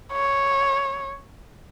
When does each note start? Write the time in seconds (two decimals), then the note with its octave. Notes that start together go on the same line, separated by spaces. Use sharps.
0.13 C#5